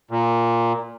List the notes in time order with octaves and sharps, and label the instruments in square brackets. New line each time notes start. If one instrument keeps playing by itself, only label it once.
[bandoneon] A#2